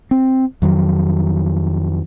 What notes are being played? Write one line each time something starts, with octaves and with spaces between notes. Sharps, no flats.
C4
F2 D#3 F#3